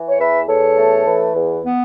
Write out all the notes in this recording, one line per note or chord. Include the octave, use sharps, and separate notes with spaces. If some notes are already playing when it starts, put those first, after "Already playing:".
Already playing: E3
C#5
E2 B4 E5
E2 A4 C#5
A3
E3
E2
B3